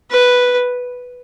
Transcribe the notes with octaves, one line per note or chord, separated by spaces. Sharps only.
B4